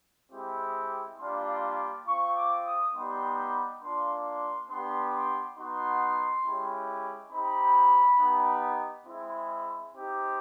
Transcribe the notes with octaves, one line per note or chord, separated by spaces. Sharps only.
G#3 C4 E4 G4
G3 A#3 D4 F4 C6
C4 F4 C#6
D6
D#6
G3 B3 D#4 G4 C6
A#3 D4 F4 C6
C6
B3 D4 G4 C6
C6
B3 D#4 F#4 C6
G#3 C#4 E4 G4
C4 D#4 G4 B5
B3 D#4 G4
G#3 C4 E4
C4 D#4 G4